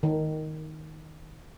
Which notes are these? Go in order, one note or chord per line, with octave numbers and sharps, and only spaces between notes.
D#3